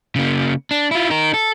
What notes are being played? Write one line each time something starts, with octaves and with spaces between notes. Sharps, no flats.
C#3 A#3
D4
E4 F4
D#4 A#4
A4